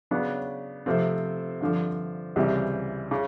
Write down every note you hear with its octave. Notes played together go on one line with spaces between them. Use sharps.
C#3 F#3 B3 D4
C3 F3 A3 C4
G2 D3 F3
C#2 C3 E3 G3
C#3